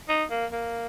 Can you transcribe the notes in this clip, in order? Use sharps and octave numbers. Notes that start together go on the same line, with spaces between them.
D#4
A#3
A#3